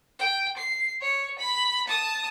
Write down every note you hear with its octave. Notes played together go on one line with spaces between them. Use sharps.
G5
C7
C#5
B5
A5 D#6